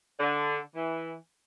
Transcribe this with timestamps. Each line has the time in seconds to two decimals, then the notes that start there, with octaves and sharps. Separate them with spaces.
0.20 D3
0.75 E3